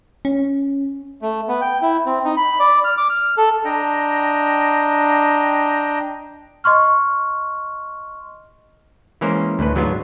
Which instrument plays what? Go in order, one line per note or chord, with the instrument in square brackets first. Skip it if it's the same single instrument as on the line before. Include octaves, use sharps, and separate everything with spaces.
[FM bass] C#4
[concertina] A3
B3
G5
E4
C4
D#4
B5
D5
F6
D6
F6
A4
[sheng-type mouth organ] D4 D#5 G5 A#5
[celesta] D#5 C6 C#6 F6
[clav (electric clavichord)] E3 G#3 A#3 C#4 A#4 C5
D2 A2 B4
G#2 F#3 G#3 B3 D4 F4